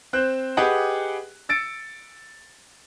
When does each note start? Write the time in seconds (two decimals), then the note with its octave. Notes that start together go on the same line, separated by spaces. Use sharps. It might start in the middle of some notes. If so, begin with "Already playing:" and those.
0.13 C4 C5 F#6
0.57 G4 G#4 B4 D#5 F#5 G5
1.49 E6 A6 C#7 D7